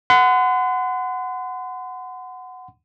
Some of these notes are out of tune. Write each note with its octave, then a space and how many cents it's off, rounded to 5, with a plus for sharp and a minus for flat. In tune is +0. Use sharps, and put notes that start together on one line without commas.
F#5 +0 C6 -45